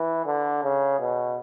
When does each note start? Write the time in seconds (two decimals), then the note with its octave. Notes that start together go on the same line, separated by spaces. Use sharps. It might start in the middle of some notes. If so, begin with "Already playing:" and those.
Already playing: E3
0.26 D3
0.64 C#3
1.00 B2